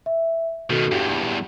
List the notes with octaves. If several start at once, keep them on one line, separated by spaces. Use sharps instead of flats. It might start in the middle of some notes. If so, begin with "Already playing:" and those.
E5
B2 D#3 F#4 A4
E2 G2 G4